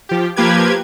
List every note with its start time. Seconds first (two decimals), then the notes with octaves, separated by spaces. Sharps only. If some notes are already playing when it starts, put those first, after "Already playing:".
0.09 F3 G4
0.36 F3 A#3 G4 B4 G#6